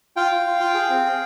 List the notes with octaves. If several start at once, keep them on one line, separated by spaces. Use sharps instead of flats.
F4 F5 G5
F4
F4
F4
G#4
C4
G#4